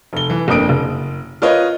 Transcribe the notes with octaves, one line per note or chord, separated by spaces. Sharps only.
F1 G7
E3
G1 F2 A#3 D#6 D7
F#1
F4 A#4 B4 C#5 D#5